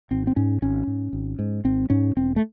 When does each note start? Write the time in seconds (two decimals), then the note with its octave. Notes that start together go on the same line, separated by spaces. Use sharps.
0.11 G#1 C4
0.27 C4
0.36 G#2 C#4
0.62 G#1 C#4
0.87 G#2
1.13 G#1
1.39 G#2
1.64 G#1 C4
1.90 G#2 C#4
2.16 E1 C4
2.36 A3